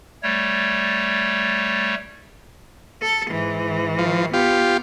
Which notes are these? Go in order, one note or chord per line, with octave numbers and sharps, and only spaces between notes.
G3 A3 C#5
A4
G#2 E3
F3
B3 F4 G4